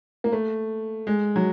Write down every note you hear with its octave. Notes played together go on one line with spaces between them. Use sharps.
A#3
A3
G#3
F#3